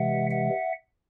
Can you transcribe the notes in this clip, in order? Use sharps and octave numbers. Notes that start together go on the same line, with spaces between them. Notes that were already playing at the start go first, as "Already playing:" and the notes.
Already playing: C3 E3 G#3 E5 F#5
E5 F#5